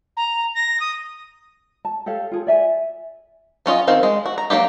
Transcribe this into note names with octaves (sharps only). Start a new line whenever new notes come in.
A#5
A#6
D#6
A5
G4 A4 C#5 F5
F4 G#4 A4
D5 E5 G#5
F#3 C#4 F4 D#5
D#3 C4 F5
G#3
F#4
A#5
F#3 A#3 D#4 F4 G4